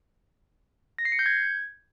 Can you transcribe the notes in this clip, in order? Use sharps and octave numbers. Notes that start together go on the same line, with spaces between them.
A#6
C7
C#7
G6
G#6